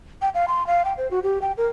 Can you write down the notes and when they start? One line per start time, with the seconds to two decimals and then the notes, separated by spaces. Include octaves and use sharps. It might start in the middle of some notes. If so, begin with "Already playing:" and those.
0.22 G5
0.34 F5
0.48 C6
0.67 F5
0.85 G5
0.97 C5
1.11 F#4
1.23 G4
1.41 G5
1.57 A#4